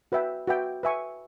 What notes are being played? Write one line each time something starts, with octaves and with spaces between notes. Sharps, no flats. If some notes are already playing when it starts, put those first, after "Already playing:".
F#4 B4 E5 G5
F#4 B4 E5 G5
B4 E5 G#5 C#6